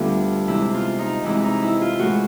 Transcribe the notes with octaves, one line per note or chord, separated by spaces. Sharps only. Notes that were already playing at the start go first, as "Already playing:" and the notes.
Already playing: D2 D3 G3 B3 D4 F4 A4
C3 E3 G#3 C4 E4
F4
D#4
C3 E3 G#3 C4 E4
D#4
E4
F4
A2 E3 G#3 F#4